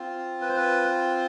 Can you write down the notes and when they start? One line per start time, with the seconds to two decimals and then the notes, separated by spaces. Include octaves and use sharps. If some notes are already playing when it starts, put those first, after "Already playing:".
Already playing: C4 F4
0.42 B4
0.49 C5
0.56 B4